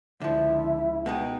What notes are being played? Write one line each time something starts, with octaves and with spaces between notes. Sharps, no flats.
C#2 D3 F3 E4 E5
B2 G#3 D#4 G5